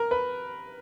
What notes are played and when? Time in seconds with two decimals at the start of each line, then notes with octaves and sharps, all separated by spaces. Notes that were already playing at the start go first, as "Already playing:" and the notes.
Already playing: A#4
0.11 B4